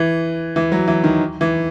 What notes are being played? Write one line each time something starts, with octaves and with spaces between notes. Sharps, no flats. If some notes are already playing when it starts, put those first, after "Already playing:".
Already playing: E3
E3
F#3
E3
D#3
E3